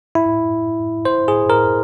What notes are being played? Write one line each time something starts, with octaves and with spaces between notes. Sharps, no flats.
E4
C5
G#4
A#4